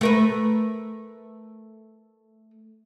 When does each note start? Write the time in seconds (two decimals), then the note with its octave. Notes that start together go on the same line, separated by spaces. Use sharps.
0.01 A3 A#4 B4